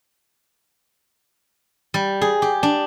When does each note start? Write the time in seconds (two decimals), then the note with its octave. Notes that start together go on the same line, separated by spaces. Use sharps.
1.94 G3
2.21 G#4
2.42 G4
2.63 D4